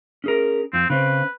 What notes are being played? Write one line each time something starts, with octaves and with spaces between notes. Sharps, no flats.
C#4 G#4 A#4
F2 C4
C#3 C4 B4